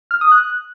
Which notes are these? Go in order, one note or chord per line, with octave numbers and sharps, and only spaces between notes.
F6
D#6
F#6